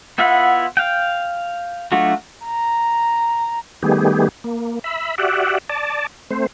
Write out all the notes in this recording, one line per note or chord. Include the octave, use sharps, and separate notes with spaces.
B3 E4 F4 E5 F#5
F5 G5
F#3 A3 D4 F4 F#4
A#5
D#3 G3 A3 B3 G4 G#4
A#3
E5 B5
F#4 G4 D5 E5 F#5
D5 A5
A3 C4 C5